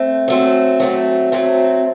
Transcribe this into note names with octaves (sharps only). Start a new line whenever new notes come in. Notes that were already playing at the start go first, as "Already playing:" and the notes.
Already playing: A3 C4
F#3 A3 C4
F#3 A3 C4
F#3 A3 C4